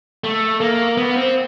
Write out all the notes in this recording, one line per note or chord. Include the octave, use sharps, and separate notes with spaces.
A3
A#3
B3
C4